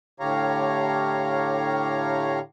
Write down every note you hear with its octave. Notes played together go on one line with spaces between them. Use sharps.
A2 D3 G4 C#5 F5 A#5